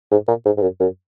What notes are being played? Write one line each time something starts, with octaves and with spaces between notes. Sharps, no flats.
G#2
A#2
G#2
G#2
F#2
F#2